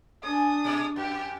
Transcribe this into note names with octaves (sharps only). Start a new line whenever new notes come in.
D4 G#4 D#6
B2 G#3 D5
F2 G4